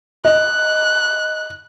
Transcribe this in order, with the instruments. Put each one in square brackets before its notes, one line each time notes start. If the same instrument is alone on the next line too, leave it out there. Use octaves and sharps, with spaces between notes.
[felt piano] D#5 [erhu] F#6